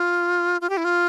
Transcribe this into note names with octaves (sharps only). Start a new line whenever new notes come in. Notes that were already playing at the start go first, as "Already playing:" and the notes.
Already playing: F4
F4
G4
E4
F4